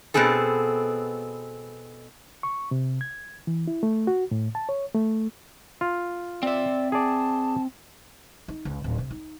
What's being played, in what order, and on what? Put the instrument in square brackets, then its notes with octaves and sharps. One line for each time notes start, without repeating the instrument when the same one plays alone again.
[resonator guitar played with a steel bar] B2 G3 B3 C4 G#4 A4
[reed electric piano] C#6
C3
G#6
E3
E4
A3
F#4
A2
A5
C#5
A3
[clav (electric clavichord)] F4
[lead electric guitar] C4 E5 [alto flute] D5
[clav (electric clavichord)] G#4 D5 [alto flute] A5
[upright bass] D#4
C#2
D1
C3
D#4